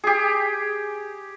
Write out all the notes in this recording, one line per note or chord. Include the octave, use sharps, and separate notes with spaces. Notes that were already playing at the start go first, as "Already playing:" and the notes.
G4 G#4